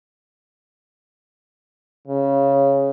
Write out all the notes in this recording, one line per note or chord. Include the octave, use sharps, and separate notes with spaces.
C#3